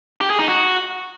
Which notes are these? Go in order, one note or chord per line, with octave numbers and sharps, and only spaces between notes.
G4
G#4
D#4
F#4